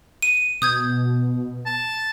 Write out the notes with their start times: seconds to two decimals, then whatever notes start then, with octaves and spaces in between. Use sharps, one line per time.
0.22 D#7
0.62 B2 D#6 G6 G#6
1.66 A5